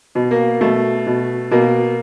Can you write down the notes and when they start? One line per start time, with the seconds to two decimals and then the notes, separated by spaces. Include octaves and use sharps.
0.15 B2
0.31 A#3
0.61 B2 A3
1.07 B2
1.51 B2 A#3